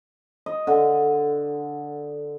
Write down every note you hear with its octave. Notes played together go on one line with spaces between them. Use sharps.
D#5
D3